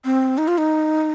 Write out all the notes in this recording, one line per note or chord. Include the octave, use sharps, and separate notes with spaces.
C4
D#4
F4
D#4